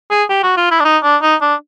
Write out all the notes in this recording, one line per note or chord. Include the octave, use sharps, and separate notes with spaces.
G#4
G4
F#4
F4
E4
D4
D#4
D4
D#4
D4